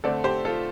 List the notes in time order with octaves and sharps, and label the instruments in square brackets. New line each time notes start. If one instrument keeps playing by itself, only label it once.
[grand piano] D3 A3 C4 A4 D5
G4 C5
F4 A4